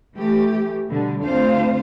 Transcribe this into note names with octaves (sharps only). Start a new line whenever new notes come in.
E3 A3 G4
B2 D3 G3
D2 C4 D4 F4 C5 F5